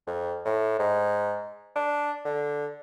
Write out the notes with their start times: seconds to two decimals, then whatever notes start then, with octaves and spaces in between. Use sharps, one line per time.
0.07 F2
0.45 A2
0.79 G#2
1.76 D4
2.25 D3